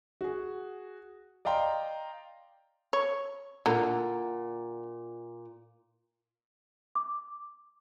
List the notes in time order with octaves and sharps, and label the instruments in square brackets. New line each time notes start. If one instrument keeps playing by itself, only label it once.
[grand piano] F#4 G#4
D5 D#5 F5 G5 A#5 C6
[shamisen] C#5
[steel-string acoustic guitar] A#2 [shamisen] D3 A#5
[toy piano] D6